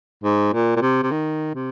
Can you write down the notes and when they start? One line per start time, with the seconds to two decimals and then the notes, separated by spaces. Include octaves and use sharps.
0.24 G#2
0.53 A#2
0.76 A#2
0.81 C3
1.03 C3
1.12 D#3
1.55 C3